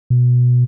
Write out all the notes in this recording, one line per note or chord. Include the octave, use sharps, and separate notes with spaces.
B2